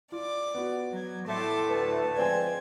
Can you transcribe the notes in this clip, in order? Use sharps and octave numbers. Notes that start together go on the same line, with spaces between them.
F4 D5 D6
B3 F#4
F#3 G#6
A2 A3 A5 C6 D6
D2 B4 A5
F3 G#3 C4 D5 G5 G#5 G#6